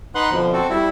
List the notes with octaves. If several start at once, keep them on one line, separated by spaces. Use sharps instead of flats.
D#4 B4 F#5 C6 F#6
F2 B2 D3 F3
C4 F#4 A4
G3 E4